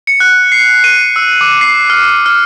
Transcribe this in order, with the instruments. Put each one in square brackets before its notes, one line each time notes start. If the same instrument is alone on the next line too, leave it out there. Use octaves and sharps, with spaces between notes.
[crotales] C#7
F#6
C7
D#7
E6
D6
C7
F6
F6